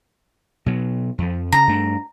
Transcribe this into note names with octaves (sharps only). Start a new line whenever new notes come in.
B2 F#3
F2 F3
C#3 A#5
G2 A3 D4